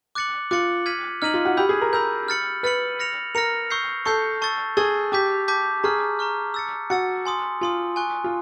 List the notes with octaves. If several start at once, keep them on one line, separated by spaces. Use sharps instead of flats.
D6 F#6 A6 C#7 F#7
F4 D6 F#6 A6 C#7 F#7
F6 G#6 B6 D#7 F#7
D#4 F6 G#6 B6 D#7 F#7
F4
F#4
G4 B5 E6 G6
G#4
A#4
A#4 B5 E6 G6
F6 A6 C#7 F#7
B4 F6 A6 C#7 F#7
F6 A#6 C#7 F7
A#4 F6 A#6 C#7 F7
C#6 E6 G6 C7
A4 C#6 E6 G6 C7
A5 C#6 E6 A6
G#4 A5 C#6 E6 A6
G4 A5 D6 G6 B6
A5 D6 G6 B6
G#4 A#5 C#6 F6
A#5 C#6 F6
E6 A6 C#7
F#4 E6 A6 C#7
G#5 C6 D#6
F4 G#5 C6 D#6
G#5 C#6 F#6
F4